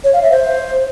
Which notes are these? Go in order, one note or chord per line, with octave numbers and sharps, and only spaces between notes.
C#5
F5
E5
C5